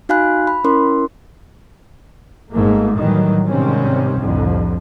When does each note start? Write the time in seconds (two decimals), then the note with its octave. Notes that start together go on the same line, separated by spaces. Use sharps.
0.09 D#4 F#4 F5 G#5 B5 F#6
0.47 B5
0.64 C#4 E4 A#4 C6
2.53 G#1 G#2 A3 A#3
2.98 A2 D#3 E3 F#3 G3
3.49 G#2 C3 D#3 G3 C4 C#4
4.18 C2 F2 A2 D3